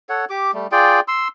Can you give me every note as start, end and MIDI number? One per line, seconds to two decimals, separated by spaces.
0.09 0.25 69
0.09 0.25 73
0.09 0.25 78
0.30 0.51 67
0.30 0.51 86
0.54 0.67 55
0.54 0.67 57
0.72 1.00 65
0.72 1.00 68
0.72 1.00 74
0.72 1.00 79
1.08 1.28 84
1.08 1.28 88